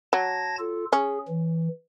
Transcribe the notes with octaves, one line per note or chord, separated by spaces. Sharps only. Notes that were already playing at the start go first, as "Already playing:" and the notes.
F#3 A5 G#6 A#6
F4 A4
C#4 G#4
E3